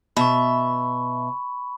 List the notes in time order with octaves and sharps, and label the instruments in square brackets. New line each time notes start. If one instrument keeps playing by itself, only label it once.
[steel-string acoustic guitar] B2 E5 [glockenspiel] B5 C#6